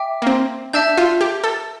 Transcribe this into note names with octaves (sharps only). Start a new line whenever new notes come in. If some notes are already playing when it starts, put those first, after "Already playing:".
Already playing: E5 G5 D6
A#3
C4
D4 E5 A5 E6 G6
F4
G4
A4